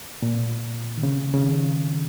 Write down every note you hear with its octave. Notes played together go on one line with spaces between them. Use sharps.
A#2
D#3
C#3
C#3
D#3